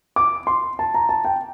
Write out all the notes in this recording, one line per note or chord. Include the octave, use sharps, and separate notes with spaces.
D6
C6
A5
A#5
A5
G5